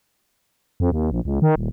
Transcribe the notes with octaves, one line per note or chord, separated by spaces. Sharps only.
F2
D#2
A#1
C#2
D#3
D#1